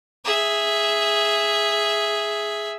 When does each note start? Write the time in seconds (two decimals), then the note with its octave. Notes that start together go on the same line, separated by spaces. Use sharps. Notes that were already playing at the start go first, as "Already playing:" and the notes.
0.25 G#4 E5